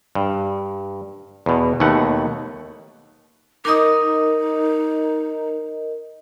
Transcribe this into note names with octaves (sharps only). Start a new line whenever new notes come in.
G2
E2 B2
D#2 B2 A3 F#5
D#4 A#4 D#5 D6 D#6